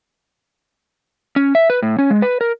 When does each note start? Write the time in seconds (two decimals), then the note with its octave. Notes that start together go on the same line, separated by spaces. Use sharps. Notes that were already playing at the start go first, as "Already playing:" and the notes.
1.36 C#4
1.55 E5
1.70 B4
1.82 A2
1.98 C#4
2.10 G#3
2.22 B4
2.41 A#4